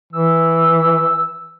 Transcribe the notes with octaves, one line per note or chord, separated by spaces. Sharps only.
E3 E6